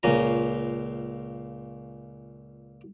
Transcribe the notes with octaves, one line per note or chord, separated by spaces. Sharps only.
C#2 A#2 C#4 A#5